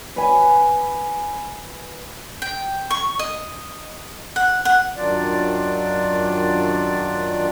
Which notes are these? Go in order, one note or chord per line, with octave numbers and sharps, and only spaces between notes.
B4 G#5
G5
C#6
D#5
F#5
F#5
F#2 D#3 F#3 D4 F4 D5